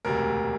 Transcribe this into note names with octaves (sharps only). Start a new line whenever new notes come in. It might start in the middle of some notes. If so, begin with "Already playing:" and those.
E1 D2 C3 A#4